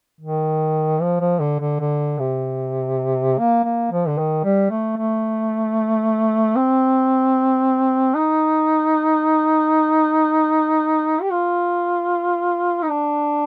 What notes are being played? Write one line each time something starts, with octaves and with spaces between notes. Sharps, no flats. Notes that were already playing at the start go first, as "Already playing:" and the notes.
D#3
F3
F3
D3
D3
D3
C3
A#3
A#3
F3
D3
D#3
G3
A3
A3
C4
D#4
G4
F4
D#4
D4